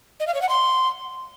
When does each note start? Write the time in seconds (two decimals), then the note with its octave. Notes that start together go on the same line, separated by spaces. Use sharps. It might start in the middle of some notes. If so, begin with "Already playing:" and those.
0.20 D#5
0.27 F5
0.34 C#5
0.42 F#5
0.49 C6